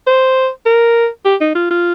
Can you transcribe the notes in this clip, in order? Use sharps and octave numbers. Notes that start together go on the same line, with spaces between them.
C5
A#4
G4
D#4
F4
F4